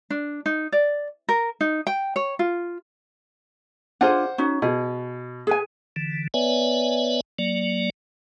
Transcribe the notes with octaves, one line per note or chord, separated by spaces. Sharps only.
D4
D#4
D5
A#4
D#4
G5
C#5
F4
D4 F4 G#4 C5 F#5
C#4 D#4 F#4
B2 G#4
G#4 B4 G#5
D3 E3
B3 B4 C#5 D5 E5 G#5
F#3 A#3 D5